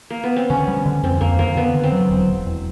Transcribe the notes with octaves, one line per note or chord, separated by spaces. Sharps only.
A#3
B3
C4
D3 C#4
G3
D3
F2 C4
F2 A#3
D3 A#3
D3 B3
D3
C4
F#3
E1
E1
E1